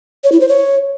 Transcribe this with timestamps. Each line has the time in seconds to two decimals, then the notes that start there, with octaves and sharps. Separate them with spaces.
0.24 C#5
0.32 E4
0.40 C5
0.49 C#5